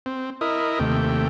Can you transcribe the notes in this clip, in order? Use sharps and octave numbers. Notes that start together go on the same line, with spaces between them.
C4
E4 A#4 D#5
D#2 C3 A3 G5